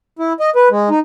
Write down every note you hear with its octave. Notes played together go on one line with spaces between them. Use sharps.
E4
D#5
B4
G#3
D#4